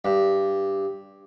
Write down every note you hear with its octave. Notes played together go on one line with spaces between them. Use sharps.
G2